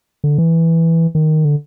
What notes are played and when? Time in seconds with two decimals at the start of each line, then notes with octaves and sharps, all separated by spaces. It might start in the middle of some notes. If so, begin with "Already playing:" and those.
0.24 D3
0.38 E3
1.15 D#3
1.45 D3